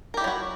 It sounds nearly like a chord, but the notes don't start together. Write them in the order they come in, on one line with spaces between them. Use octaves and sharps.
A#4 G4 E4 F#3 F#4